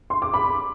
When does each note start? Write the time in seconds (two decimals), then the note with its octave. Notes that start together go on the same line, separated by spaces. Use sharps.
0.10 C6
0.22 D6
0.34 B5